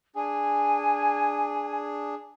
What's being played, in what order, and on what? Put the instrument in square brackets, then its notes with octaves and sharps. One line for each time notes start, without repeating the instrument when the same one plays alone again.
[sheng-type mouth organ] D4 G#4 [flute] G#5